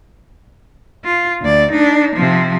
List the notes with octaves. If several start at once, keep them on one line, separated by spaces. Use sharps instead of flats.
F4
D2 D5
D4 D#4
C3 F3